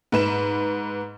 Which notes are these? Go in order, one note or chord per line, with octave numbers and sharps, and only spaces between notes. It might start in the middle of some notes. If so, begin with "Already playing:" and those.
G#2 B4 E7